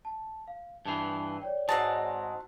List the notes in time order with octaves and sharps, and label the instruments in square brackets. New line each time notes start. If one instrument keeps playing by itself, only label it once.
[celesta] A5
F5
[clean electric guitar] G2 E3 [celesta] A5 C7
[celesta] C#5 D5 G5
[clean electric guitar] G#2 G#3 [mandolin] C4 F#4 A5